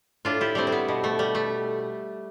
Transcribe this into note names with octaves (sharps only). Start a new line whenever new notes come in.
A2 D4 F4
E4 G4
G3 A3 C4
C4
B3
B2
A3
G3
A3